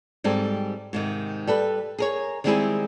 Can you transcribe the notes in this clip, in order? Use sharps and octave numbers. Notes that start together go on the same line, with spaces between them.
G#2 G3 C4 A4
G#2 C3 D#3
G3 A4 B4
G#4 A#4 C#5
D#3 G3 G#3 C4 E4 G#4